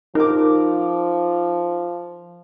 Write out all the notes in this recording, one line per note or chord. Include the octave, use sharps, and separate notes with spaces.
F3 D#4 A#4 D6